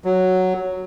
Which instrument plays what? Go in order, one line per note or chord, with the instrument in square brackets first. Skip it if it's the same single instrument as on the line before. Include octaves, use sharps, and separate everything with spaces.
[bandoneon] F#3